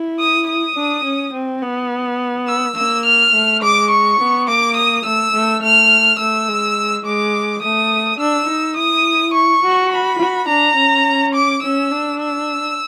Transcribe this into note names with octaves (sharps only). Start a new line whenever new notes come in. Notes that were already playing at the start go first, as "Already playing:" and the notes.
Already playing: E4
D#6
D#6
D4
C#4
C4
B3
E6
A#3 E6
F6
A3
G#3 D6
C#6
B3
A#3 D6
D#6
A3 E6
A3
A3 F6
A3 E6
G#3
G#3 D6
A3 D#6
D4 E6
D#4
E4 D#6
C#6
F#4
B5
F#4
D4 A#5
C#4
D6
C#4 E6
D4
E6